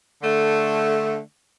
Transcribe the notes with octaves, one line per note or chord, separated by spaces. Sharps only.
D3 A3